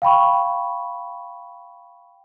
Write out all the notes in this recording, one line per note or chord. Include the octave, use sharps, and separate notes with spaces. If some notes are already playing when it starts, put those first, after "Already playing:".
F5 G5 B5 C#6